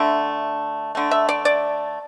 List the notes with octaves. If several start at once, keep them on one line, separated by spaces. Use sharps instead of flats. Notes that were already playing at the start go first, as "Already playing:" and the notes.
Already playing: D3 A3 E5
D3 A3
E5
D5
D5